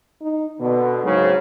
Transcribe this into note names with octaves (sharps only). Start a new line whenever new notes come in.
D#4
B2 D3 B3
G#2 C#3 F#3 C4